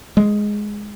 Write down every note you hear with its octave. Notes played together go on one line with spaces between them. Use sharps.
G#3